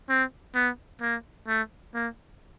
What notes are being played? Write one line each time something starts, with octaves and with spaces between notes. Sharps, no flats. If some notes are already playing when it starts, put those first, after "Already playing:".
C4
B3
A#3
A3
A#3